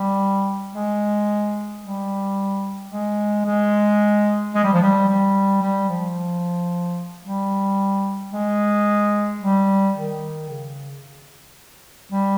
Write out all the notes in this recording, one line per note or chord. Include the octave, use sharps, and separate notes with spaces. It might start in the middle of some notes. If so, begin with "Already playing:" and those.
Already playing: G3
G#3
G3
G#3
G#3
G#3
G3
F3
G3
G3
G3
F3
G3
G#3
G3
D#3
C#3
G3